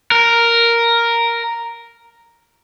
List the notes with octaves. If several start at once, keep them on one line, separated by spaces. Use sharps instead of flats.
A#4